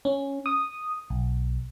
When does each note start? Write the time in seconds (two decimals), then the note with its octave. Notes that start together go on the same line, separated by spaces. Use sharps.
0.05 C#4
0.46 D#6
1.10 B1